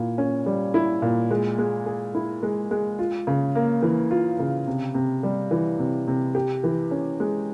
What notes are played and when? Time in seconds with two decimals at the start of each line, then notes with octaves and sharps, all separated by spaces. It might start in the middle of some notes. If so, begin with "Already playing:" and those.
Already playing: A#2 E4
0.18 C#4
0.46 G3
0.74 E4
1.02 A#2
1.31 G#3
1.58 G#3
1.86 G#4
2.15 E4
2.43 G#3
2.71 G#3
2.99 F4
3.27 C#3
3.55 A#3
3.82 E3
4.11 F4
4.39 C#3
4.67 C3
4.94 C3
5.23 G3
5.51 E3
5.79 C3
6.08 C3
6.35 G4
6.64 E3
6.91 C#4
7.20 G#3